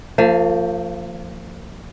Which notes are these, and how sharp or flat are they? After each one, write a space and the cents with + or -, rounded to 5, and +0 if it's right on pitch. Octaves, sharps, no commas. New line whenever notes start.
F3 +0 A#3 -45